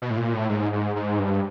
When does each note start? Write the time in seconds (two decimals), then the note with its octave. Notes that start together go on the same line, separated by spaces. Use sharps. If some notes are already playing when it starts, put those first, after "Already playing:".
0.02 B2
0.10 A2
0.17 A#2
0.33 A2
0.49 G#2
0.73 G#2
0.96 G#2
1.19 G2